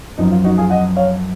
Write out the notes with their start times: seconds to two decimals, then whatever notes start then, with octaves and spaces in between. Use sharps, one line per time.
0.18 F#2 F3 D#4
0.31 F4
0.44 D#4 F#4
0.58 F4 G#4
0.70 D#5 F#5
0.96 C#5 F5